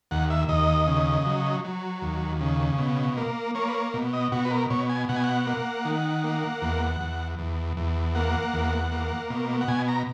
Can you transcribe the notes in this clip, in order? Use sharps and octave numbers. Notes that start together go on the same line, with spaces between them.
D#2 F#5
E5
D#2 D#5
C#3
F#3
F#3
D#2
C#3
B2
A#3
A#3 C#5
B4
C#5
B2
D#5
B2 F#4
B4
A#4
B2 C#5
G#5
B2 F#5
G#5
F#5
A#3
D#3
A#3
E2
E2
E2
E2
A#3 F#5
E2
A#3
B2
F#5
B2 G#5
A#5